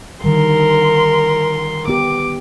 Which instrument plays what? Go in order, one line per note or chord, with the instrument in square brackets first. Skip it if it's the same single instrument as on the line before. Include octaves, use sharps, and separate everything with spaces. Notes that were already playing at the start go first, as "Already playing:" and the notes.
[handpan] D3 D#3 G3 [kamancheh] A#4 C6
[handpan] B3 G4 [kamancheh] D6